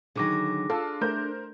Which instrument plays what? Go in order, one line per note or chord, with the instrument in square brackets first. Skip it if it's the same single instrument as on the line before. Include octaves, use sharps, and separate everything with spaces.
[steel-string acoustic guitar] D3 D#3 F#3 [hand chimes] G#4 D6 A#6
[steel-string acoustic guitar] D4 [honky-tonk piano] F4 [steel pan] A4
[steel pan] A3 [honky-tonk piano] A#4 C5 G6